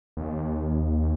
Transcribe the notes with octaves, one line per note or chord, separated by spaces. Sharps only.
D#2